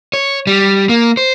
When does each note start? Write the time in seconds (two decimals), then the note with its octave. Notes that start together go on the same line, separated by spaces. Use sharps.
0.13 C#5
0.47 G3
0.89 A#3
1.17 C5